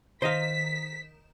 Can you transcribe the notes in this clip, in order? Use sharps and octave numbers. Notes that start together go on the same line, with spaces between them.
D#3 C5 D#5 F5 B6 E7